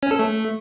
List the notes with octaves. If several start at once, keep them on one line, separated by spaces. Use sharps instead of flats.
C#4
A4
A3